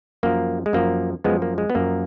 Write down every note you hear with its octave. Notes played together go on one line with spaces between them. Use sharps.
F#2 F3 A#3
G#3
F#2 F3 A#3
F#2 F3 G#3 B3
A#3
G#3
B3
F#2 F3 A#3